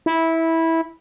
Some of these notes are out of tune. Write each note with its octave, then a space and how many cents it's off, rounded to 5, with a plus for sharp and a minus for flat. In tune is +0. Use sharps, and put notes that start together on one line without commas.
E4 -15